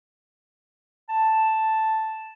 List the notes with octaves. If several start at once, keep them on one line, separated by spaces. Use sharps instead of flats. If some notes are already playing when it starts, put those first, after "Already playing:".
A5